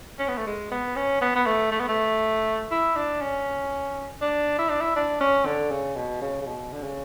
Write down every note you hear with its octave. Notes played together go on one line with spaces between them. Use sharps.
C#4
B3
A3
G#3
B3
C#4
B3
B3
A3
A3
B3
A3
E4
D4
C#4
D4
E4
D4
E4
D4
C#4
D3
C#3
B2
C#3
C#3
B2
D3
C#3